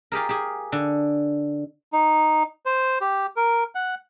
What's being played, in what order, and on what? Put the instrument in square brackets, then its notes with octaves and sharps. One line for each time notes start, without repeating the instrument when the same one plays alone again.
[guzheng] F4 G4 G#4 A#4
G4 G#4
D3
[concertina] D#4
C5
G4
A#4
F#5